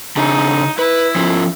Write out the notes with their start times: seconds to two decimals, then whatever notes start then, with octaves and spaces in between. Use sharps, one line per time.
0.16 C#3 D4 D#4 G#4
0.79 E4 B4
1.16 F3 C#4 F4